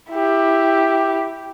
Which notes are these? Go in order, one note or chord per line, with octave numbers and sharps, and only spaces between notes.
E4 G4